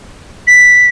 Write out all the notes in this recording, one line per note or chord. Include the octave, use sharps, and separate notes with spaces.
B6